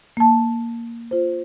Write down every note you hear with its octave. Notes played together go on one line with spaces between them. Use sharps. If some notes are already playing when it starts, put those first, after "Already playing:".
A#3 A5
F4 C5